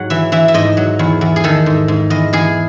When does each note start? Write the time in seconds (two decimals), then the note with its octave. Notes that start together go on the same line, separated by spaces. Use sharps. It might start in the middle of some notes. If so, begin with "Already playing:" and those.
Already playing: G#2 F#3 F#5
0.10 E3 E5
0.32 E3 E5
0.48 E5
0.54 G#2 D#5
0.77 F#3
0.99 E2
1.21 E2
1.36 G#4
1.44 D#3 A4
1.66 G#2
1.88 G#2
2.10 E2 D#5
2.33 E2 G#4